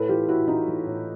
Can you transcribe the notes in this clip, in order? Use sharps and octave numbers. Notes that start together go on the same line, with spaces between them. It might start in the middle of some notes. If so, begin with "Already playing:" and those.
Already playing: A2 A4 B4
E3 F4 G4
A2 E4 F#4
E3 D#4 F4
E3
A2